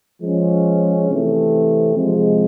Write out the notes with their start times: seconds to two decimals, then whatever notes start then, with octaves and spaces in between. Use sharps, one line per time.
0.21 F3 G#3 C#4
1.08 C3 E3 A3 C4
1.95 C3 F3 G#3